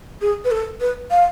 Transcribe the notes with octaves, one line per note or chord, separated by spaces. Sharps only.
G#4
B4
A4
B4
F5